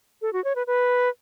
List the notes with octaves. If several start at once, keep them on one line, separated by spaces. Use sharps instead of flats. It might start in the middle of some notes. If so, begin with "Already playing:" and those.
A4
F#4
C#5
B4
B4